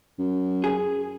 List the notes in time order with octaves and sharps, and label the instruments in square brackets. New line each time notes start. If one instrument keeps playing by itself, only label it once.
[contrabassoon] F#2
[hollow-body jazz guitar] G#4